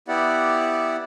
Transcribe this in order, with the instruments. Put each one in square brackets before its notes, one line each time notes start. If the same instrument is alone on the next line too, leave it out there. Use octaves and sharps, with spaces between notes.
[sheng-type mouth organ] B3 E4 G4 D5 F#5